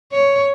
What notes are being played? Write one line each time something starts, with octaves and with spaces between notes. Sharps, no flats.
C#5